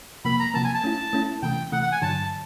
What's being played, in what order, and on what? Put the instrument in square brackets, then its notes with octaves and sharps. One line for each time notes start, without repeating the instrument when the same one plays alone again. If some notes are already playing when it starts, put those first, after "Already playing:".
[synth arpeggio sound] C3 F3 A#3 [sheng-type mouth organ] B5
[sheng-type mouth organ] A#5
[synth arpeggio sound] C3 F3 A#3 [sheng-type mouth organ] A5
[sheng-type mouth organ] G#5
A5
[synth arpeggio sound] A3 C#4 E4
A3 C#4 E4
[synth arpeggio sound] C3 E3 A3 [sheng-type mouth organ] G5
[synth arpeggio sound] C3 E3 A3 [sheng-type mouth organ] F#5
[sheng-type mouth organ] F#5
G#5
[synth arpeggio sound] G2 D3 F#3 [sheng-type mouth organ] A5